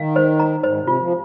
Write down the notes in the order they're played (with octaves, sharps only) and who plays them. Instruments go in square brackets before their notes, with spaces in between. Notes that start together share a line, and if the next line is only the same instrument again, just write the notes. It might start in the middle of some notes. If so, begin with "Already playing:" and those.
Already playing: [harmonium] D#3 [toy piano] F5
[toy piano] C5
A#5
[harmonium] G#2 [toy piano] C5
[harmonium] C3
[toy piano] F4
[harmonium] F3